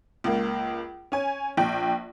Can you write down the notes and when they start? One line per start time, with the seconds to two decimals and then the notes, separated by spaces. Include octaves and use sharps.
0.24 C#2 A#3
1.12 C#4 G#5
1.57 A#1 G5